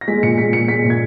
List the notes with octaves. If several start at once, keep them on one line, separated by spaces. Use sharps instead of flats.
A#6
G#3 B6
A#2 C#7
G#3 B6
A#2 C#7
G#3 B6
A#2
G#6